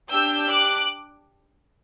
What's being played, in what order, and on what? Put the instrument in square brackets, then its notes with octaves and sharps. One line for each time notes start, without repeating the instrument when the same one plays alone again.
[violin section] D4 G4 E6 G6
D6 F#6